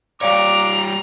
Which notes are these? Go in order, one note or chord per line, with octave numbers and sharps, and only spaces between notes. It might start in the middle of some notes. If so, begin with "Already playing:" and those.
G3 C#5 D5 F5 G5 A#5 D6